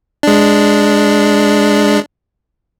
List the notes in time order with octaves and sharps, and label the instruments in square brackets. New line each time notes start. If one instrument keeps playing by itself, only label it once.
[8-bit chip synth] G#3 D4